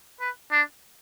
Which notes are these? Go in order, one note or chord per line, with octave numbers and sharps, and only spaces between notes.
B4
D4